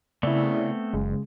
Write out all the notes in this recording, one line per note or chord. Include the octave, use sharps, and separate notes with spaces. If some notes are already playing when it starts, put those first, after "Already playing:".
C#3 A3 B3 C4 E4 D5
F#1 C#3 G#3